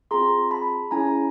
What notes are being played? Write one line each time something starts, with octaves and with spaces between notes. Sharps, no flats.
C4 F4 G#4 A#5 C6
A5 B5
C#4 E4 G#4 G#5 A#5